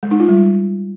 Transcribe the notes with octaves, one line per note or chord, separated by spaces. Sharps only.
G#3
D#4
F4
G3